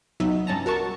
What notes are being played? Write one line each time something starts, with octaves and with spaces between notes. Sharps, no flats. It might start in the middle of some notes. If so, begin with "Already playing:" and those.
C2 F#3 B3 D#4 E5
G2 C#4 A5 A#5
F#4 A#4 A5 C#6